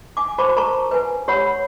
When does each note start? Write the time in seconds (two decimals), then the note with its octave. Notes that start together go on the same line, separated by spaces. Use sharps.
0.17 G#5 D6
0.38 F#4 C5 A5 B5 C#6 D6
0.56 A#4 A5 A#5 C#6
0.91 B4 G#5
1.28 G4 C#5 F#5 B5 E6